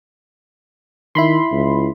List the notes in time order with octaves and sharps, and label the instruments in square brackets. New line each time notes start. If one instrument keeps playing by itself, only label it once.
[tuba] D#3 [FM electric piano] E4 B5 C6
[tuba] C#2